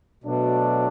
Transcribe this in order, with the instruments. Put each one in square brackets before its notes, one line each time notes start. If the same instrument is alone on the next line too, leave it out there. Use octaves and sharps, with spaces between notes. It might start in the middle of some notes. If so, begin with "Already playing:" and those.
[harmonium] B2 [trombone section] F#3 A3 D4